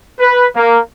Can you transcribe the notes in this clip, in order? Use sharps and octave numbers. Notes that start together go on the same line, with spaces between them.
B4
A#3